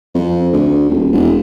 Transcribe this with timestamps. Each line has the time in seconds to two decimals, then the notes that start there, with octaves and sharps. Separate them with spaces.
0.15 F2
0.53 D2
0.89 D#1
1.13 E1